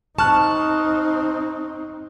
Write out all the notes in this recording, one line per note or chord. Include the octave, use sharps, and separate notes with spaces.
C4 D#4 A5 C#6 F6 F#6